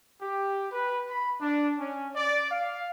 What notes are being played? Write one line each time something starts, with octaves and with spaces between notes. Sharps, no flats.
G4
B4
B5
D4
C#4
D5
F5